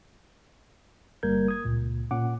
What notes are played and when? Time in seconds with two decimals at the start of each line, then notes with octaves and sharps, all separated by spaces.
1.23 G1 G3 A#3 A#4 G6 G#6
1.48 D#6 G#6
1.65 C#2 A#2
2.11 A#2 C#4 F#5 D6